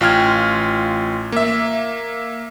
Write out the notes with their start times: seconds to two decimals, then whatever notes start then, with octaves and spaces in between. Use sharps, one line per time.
0.01 A1 F4 G5 F6 G#6
1.32 A#3 E5